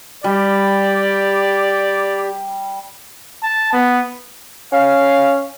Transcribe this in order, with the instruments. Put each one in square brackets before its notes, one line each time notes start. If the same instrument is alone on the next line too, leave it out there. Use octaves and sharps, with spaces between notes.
[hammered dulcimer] G3 [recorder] G4 [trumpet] D5
[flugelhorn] A5
B3
[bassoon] C#4 [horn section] F5